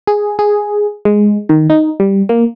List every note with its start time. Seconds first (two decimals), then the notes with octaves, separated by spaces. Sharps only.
0.07 G#4
0.39 G#4
1.05 G#3
1.49 D#3
1.70 D#4
2.00 G3
2.29 A#3